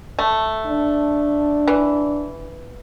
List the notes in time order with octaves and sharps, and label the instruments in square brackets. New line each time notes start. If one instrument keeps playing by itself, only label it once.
[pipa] A3
[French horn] D4
[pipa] E3